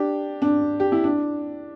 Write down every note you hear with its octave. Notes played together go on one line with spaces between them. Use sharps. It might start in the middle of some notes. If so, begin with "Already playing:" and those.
Already playing: D4 G4
D4
G4
E4
D4